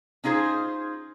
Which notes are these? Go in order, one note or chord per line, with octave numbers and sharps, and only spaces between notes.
C#4 D#4 F4 G#4 C5